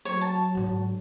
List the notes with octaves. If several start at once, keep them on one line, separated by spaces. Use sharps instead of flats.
F#3 C#5
A5
G#2 D3